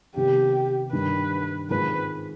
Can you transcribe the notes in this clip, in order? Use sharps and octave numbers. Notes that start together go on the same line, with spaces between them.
C3 D#3 B3 G4
G2 D#3 G3 B4
G#2 D#3 G#3 C4 F4 B4